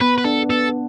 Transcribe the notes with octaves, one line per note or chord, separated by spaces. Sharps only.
B3 B4
B4
D4 A4
B3 A4